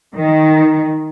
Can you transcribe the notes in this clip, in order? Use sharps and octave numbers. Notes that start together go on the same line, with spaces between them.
D#3